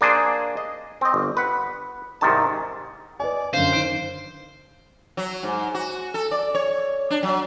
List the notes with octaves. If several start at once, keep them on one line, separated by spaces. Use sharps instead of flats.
A#3 D4 G#4 C5
D#5
C4 D#5
G1
B4 F#5
C2 G#2 C3 D#3 A5
B4 D5 D#5 G#5
F#2 D3 C5 F5
D#3 D7
F#3
G#2
F#4
A4
D5
C#5
D4
F#3